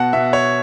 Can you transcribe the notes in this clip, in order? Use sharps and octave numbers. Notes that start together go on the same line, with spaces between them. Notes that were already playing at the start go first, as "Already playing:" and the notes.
Already playing: B2 F#5 A5
B2 E5
C#5